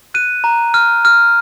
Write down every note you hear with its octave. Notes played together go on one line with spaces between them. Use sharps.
F#6 D#7
A#5
F6
F6